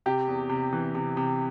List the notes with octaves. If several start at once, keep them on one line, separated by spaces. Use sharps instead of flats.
C3 G4
E2
C3
E3
C3
C3